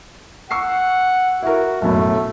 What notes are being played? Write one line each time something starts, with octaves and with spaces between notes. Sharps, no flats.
F#5 C#6 E6 C7
E4 F#4 A#4
B1 F#2 A2 A3